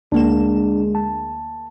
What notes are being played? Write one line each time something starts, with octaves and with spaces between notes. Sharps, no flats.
D2 G#3 A#3 D4 E7
A5